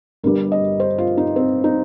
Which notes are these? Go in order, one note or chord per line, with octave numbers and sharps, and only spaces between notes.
G1 G2 G3 A#4
D#5
C5
F4
D#4
C4
D#4